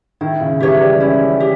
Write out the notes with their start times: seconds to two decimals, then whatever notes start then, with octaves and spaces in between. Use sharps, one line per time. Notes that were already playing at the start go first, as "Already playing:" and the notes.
0.21 D#3 E4
0.41 C#3
0.60 E3 G4 C#5 E5
0.81 G3
1.00 C#4 E4
1.40 G4